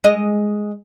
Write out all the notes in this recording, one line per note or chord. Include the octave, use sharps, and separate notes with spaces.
G#3 D#5